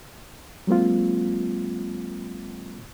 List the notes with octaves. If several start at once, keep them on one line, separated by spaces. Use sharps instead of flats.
F#3 G#3 A#3 C4 F4